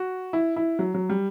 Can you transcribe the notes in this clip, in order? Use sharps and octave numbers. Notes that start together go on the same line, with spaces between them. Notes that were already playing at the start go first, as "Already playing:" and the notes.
Already playing: F#4
E4
E4
F#3
F#3
G3